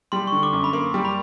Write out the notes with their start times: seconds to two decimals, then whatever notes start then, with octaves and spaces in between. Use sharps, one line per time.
0.12 G3 C6
0.27 C#6
0.32 D3
0.43 D6
0.53 F#2
0.64 B5
0.73 A#3 C6
0.94 G3
1.05 B5